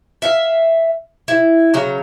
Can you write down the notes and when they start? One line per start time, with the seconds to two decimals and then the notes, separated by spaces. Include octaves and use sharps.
0.22 E5 F5
1.28 E4
1.74 C#3 F#3 A#5